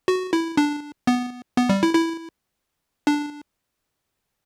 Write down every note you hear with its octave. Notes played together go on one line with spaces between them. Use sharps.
F#4
E4
D4
B3
B3
G3
E4
E4
D4